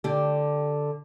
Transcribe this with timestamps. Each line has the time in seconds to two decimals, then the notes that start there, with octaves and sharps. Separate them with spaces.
0.04 D3 G4